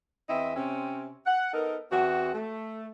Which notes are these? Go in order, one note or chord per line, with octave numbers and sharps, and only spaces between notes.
E2 C4 E4 D#5 E5
C3 C4 C#4
F#5
B3 D#4 A4 A#4
E2 C4 F#4
A3